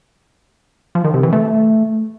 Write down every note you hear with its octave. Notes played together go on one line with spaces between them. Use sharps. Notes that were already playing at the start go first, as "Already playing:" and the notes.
F3
D#3
C3
E3
A3